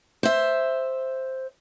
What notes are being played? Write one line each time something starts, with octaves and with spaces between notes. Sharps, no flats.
C5 E5